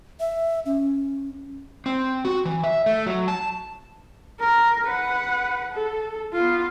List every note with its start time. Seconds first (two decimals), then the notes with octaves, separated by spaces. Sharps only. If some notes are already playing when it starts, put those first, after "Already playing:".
0.20 E5
0.66 C#4
1.86 C4
2.25 F#4
2.45 E3
2.64 E5
2.86 A3
3.06 F#3
3.28 A5
4.40 A#4
4.86 B4 F#5
5.71 A4
6.33 B3 F4